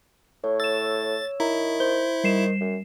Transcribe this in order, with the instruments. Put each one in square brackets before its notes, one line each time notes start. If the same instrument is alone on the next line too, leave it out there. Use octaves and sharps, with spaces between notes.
[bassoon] A2 [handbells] C#5
[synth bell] E6 E7 [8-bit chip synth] A6
[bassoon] D#3 [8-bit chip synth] E4 [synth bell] A#5
[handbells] C5 [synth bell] G7
[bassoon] D#3 [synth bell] G3 C7 E7
[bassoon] F#2